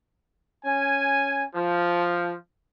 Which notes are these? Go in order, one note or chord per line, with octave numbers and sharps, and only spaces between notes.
C#4 G#5
F3